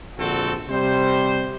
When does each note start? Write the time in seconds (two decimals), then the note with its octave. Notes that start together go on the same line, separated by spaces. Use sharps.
0.18 A#1 D3 C4 F#4 A4
0.69 C3 G3 C5